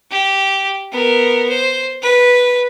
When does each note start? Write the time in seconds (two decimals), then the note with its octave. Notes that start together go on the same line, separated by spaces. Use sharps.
0.11 G4
0.92 B3 A#4
1.49 C5
2.03 B4